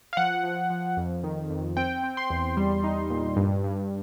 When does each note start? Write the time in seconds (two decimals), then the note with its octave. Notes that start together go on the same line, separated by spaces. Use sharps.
0.13 F5
0.17 F3 F#5
0.43 F3
0.70 F3
0.97 F2
1.24 D#3
1.50 F2
1.77 C4 G5
2.03 C4
2.17 C6
2.30 E2
2.57 G3
2.84 D#4
3.10 A#2
3.37 G2
3.64 G2